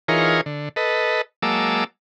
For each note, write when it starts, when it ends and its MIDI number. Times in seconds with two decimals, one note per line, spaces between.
0.08 0.41 52
0.08 0.41 63
0.08 0.41 65
0.08 0.41 68
0.08 0.41 70
0.08 0.41 73
0.46 0.69 50
0.76 1.21 69
0.76 1.21 71
0.76 1.21 75
1.42 1.84 54
1.42 1.84 56
1.42 1.84 58
1.42 1.84 81
1.42 1.84 86
1.42 1.84 88